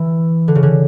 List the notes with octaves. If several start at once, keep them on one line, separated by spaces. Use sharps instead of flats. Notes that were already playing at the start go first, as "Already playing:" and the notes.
Already playing: E3
D3
C#3
D3